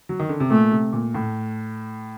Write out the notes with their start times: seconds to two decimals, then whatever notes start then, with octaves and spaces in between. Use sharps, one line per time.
0.09 F#3
0.19 D#3
0.29 D3
0.40 C3
0.50 A#2 A3
0.72 C3
0.93 A#2
1.14 A2